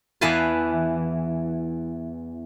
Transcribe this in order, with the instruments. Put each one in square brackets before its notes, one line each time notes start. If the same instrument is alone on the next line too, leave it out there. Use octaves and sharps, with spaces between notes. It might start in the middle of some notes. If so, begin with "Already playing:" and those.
[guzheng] E2 E3 B4 F5 G#5 A5